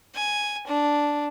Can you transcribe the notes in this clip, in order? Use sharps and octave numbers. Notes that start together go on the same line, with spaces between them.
G#5
D4